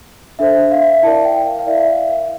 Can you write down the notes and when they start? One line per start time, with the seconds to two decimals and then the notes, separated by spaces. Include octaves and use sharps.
0.39 D4 A4 C5 E5
0.72 F5
0.78 E5
0.93 E5
1.03 E4 A#4 D5 A5
1.24 G5
1.36 G5
1.46 F5
1.59 F5
1.67 E4 A#4 D5 E5
1.80 E5
1.88 F5